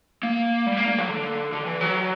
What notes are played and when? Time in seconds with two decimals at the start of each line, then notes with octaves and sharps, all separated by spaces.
0.23 A#3
0.66 G3
0.77 A#3
0.88 A#3
0.98 F#3
1.09 D3
1.52 D3
1.66 E3
1.81 F#3